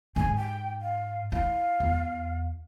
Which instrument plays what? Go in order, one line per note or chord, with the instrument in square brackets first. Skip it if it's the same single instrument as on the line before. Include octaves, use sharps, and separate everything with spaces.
[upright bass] G#2 D#4 [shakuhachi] G#5
[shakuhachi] G5
F5
[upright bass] E4 [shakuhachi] F5
[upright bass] E2